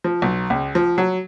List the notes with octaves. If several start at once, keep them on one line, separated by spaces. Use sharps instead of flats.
F3
B1
C#2
F3
F#3